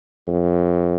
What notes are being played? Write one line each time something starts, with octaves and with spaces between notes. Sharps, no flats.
F2